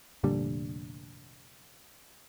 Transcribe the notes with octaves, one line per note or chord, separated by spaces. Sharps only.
F1 A#2 D3 G3